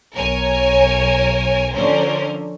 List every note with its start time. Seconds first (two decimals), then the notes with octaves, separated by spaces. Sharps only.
0.15 B1 A#4 C#5 G#5
1.73 D3 F3 C#4 A#4 C5